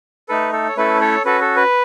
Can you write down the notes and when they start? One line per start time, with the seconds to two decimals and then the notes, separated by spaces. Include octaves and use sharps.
0.29 A3 D#4 A4 B4
0.53 A4
0.68 C#5
0.77 A3 C#4 E4 A4 B4
1.01 A4 C#5
1.25 C#4 F#4 A4 B4
1.41 A4
1.56 B4